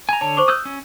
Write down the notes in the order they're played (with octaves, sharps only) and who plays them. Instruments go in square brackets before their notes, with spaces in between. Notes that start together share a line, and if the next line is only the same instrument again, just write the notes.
[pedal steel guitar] G#5 A#5 [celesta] G#6
[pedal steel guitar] D3 C#5 [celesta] A5
[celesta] C5 C#6 D6
[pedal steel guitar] D#6 F#6 G6 [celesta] E6
[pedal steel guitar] C#4